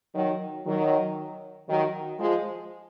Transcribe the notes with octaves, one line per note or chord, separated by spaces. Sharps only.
D#3 F#3
D#3 F#3
D#3 F#3
F3 G#3